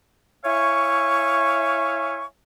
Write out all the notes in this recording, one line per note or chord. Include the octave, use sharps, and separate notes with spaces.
E4 C#5 E5 F5 G#5 C#6